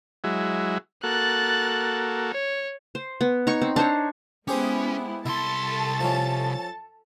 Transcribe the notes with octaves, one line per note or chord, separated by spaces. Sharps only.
F#3 G#3 E4
A#3 F#4 A4 F#6 A6
C#5
C5
B3
D#4 C#5 C#6
C4
D4 D#4 C5 C#5
G#3 B3 C#4 E4 G4 G#4 C5
C2 E4 A4 A5 C6 A6
F3 C#4